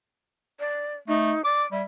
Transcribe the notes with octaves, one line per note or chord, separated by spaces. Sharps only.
D5
A3 D#4
D5 D6
G3 E5